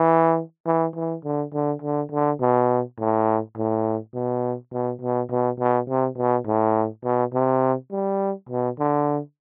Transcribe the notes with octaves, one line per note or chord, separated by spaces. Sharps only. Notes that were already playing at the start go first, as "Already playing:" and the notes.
Already playing: E3
E3
E3
D3
D3
D3
D3
B2
A2
A2
B2
B2
B2
B2
B2
C3
B2
A2
B2
C3
G3
B2
D3